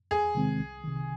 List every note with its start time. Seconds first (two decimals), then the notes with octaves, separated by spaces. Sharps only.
0.11 E2 G#4
0.35 C3 D#3 G#3 C4
0.59 C2
0.84 C3 D#3